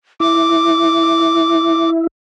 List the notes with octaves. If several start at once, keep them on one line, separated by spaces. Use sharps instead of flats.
E4 D6